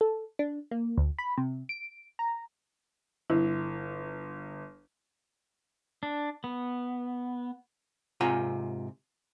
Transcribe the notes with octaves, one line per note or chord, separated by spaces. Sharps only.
A4
D4
A#3
D2
B5
C3
D7
A#5
G1 E4
D4
B3
G#2 C3 F4 G#5 A#5